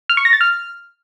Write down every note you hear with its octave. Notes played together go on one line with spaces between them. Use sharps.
F6
C#6
A#6
A6
F6